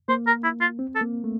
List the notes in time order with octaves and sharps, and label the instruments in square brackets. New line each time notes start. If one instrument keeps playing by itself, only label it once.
[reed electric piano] A#3 [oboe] C5
[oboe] A#4
E4
F4
[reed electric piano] C4
[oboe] A4
[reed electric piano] A#3
A3